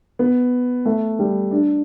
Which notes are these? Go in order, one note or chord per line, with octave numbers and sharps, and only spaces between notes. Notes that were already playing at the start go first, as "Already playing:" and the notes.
B3
A3
G3
D4